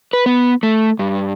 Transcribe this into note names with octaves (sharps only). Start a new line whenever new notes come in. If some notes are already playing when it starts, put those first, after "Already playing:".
B4
B3
A3
G2